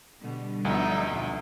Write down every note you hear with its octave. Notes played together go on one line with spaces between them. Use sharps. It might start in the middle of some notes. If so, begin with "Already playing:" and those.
B2 D3 G3
D2 F3 B3 D4 D#4 E5
F2 B2